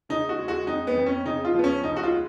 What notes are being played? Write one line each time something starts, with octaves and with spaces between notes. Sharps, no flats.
C#3 D#4
F#4
G#3
F#4
F2 D#4
B3
F2
C#4
C#3 D#4
F4
F3 B3
C#4
C#2 D#4
F#4
F4
G#3